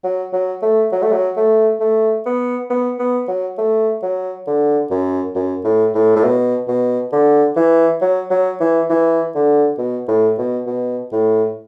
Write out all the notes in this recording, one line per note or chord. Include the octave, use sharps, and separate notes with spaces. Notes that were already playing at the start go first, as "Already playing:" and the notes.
F#3
F#3
A3
F#3
A3
F#3
A3
A3
B3
B3
B3
F#3
A3
F#3
D3
F#2
F#2
A2
A2
A2
B2
B2
D3
E3
F#3
F#3
E3
E3
D3
B2
A2
B2
B2
A2